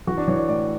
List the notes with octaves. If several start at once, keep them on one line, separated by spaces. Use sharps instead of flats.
E3 F#4
D4
E3 C#5
D5
A2 D5